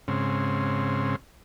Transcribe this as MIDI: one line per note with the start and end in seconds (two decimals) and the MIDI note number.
0.08 1.16 44
0.08 1.16 49
0.08 1.16 60